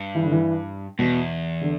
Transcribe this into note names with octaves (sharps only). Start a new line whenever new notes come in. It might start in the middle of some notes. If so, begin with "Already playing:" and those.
Already playing: G2
E3
D3
E3
E2 B2
D3